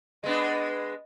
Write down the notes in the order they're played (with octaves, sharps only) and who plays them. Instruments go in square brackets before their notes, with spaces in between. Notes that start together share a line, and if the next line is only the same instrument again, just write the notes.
[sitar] G#3 B3 D4 [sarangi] D#5